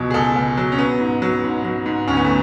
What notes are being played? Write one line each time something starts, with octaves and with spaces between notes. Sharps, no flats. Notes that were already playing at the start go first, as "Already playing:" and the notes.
Already playing: C#2 B2 F#3 C#5
G#4
C#2 A4
C#2
F#3
C#4
F#3 B3
G#2
F#3
G#2
F#3
G#2
D2 C#4
B3
A3